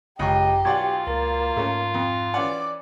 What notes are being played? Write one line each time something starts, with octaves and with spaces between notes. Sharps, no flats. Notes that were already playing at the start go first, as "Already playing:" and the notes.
G#1 C#2 F#2 G4 D#5 A#5 C#6
B1 F4 D5 F#5 G#5 C#6 G#6
C#2 A#3 A#4 A6
G#2 A3 C#4
F2
E3 C#4 D5 F#5 D6